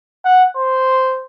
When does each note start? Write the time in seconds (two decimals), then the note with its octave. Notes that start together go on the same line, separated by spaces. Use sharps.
0.25 F#5
0.57 C5